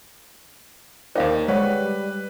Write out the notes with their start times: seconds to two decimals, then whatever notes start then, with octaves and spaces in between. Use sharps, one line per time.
1.16 D#2 D#4 A#4 C5 D5 F5
1.48 G3 G#3 B4 C#5 F#5